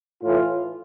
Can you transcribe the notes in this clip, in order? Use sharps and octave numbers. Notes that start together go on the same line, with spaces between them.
A2 F4
E3